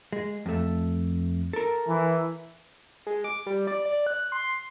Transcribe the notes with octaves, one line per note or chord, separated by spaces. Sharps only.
G#3
F2 A3
A4 A#4
E3
G#3
D6
G3
D5
D5
F#6
C6